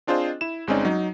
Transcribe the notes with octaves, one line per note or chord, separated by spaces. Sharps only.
C4 D4 F4 G#4 C5 D#5
E4 E7
G1 G#3 C4 C#4 D#4 D5
F#3 D#4